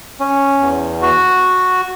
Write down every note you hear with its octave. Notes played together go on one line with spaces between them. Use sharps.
C#4
E2
F#4